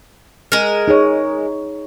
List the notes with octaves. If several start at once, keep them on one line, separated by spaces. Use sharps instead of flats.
G#3 A#4
D#4 G#4 C#5